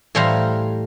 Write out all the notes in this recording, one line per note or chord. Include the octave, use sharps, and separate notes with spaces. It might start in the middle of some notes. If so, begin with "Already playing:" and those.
A2 E3 G3 C5 F5 A#5